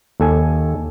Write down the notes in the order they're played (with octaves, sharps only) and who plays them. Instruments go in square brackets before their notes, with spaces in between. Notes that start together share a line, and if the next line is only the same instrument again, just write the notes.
[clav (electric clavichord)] D#2 A4 G#5